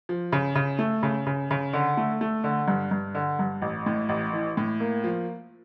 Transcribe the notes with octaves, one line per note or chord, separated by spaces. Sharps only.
F3
C#3
C#3
A3
C#3
C#3
C#3
D3
A3
A3
D3
G2
G2
D3
G2
A1
A2
A1
E3
A2
A#3
F3